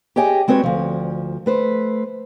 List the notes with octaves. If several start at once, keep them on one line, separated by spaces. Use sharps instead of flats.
G4 G#4 C#5 D#5 G5 G#5
G#3 C4 F#4 B4 C#5
D2 F3
A3 B4 C5